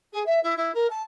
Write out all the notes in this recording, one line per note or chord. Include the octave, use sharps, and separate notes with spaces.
G#4
E5
E4
E4
A#4
A5